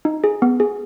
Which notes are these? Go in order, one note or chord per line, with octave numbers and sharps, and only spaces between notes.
D#4
G#4
B3
G#4